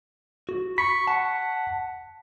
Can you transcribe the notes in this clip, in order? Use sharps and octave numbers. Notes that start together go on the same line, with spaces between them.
F#4
B5 C#6 B6
F#5 A5